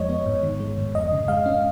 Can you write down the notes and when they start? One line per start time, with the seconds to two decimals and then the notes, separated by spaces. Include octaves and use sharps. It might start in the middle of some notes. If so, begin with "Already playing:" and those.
Already playing: F2 F3 G#3 C#5 D#5
0.09 B3
0.26 G#2
0.43 D#3
0.60 G#3
0.78 G#2
0.95 F2 D#5
1.12 C#3
1.28 G#3 F5
1.46 C#4